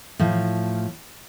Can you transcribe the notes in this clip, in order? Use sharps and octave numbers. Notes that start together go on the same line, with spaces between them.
A2 F3